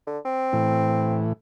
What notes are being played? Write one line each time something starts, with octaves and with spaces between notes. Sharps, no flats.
D3
C4
A2 E3